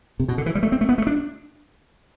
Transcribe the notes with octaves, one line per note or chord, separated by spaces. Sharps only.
C3
B2
D3
E3
G3
A3
C4
A3
B3
A3
D4